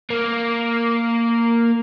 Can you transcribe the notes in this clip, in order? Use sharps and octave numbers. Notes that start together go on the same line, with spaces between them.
A#3